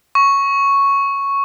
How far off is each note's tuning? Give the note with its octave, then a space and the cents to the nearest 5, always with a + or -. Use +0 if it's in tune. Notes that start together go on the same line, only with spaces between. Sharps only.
C#6 +0